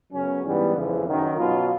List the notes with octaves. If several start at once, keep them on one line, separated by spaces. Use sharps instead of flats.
F#2 C#3 F#3 B3 C#4
G#2 E3 G3 B3
F2 C#3 E3
F#2 D#3 F#3
B2 F#3 B3 F4